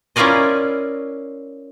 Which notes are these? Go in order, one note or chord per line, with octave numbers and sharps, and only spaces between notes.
C#4 E4 F4 A#4 D5 D#5